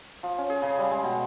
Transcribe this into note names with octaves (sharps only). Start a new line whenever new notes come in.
F3
C#4
G#4
C#3
G3
G#3
B2